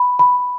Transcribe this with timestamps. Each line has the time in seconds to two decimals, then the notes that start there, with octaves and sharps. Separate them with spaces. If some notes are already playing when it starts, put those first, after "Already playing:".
Already playing: B5
0.19 B5